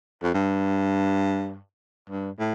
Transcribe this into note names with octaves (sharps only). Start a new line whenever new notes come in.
F2
G2
G2
A2